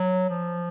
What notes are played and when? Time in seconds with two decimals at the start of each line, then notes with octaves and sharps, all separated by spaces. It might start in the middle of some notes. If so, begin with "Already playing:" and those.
Already playing: F#3
0.29 F3